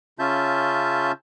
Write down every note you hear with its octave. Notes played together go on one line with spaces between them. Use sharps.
C#3 C#4 F4 E5 A5 G6